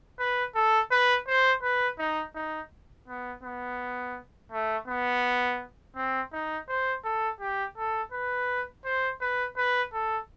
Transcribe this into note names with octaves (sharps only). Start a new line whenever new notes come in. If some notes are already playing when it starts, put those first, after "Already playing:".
B4
A4
B4
C5
B4
D#4
D#4
B3
B3
A3
B3
C4
D#4
C5
A4
G4
A4
B4
C5
B4
B4
A4